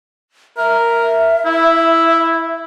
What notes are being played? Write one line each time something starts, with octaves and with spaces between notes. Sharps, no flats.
A#4 E5
E4